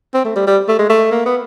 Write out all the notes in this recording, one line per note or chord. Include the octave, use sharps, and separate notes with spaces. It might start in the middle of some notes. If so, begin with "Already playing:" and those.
C4
A3
G3
G3
A3
G#3
A3
A#3
B3